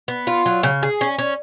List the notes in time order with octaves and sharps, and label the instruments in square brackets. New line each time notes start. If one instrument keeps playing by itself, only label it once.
[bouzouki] B3
F4
F#3
C#3
G#4
C#4
C#4